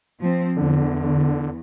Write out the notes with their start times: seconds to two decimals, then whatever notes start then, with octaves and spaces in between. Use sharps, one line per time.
0.21 F3 C4
0.56 E2 D3